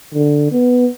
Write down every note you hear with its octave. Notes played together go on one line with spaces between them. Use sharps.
D3
B3